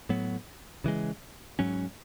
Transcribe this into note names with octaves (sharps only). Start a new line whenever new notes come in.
A2 F#3 B3
C#3 E3 G#3
G#2 F#3 C#4